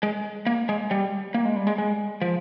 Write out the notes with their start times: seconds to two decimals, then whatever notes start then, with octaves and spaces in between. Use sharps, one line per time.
0.03 G#3
0.46 A#3
0.69 G#3
0.91 G3
1.34 A#3
1.45 G#3
1.56 G3
1.67 G#3
1.78 G#3
2.22 F3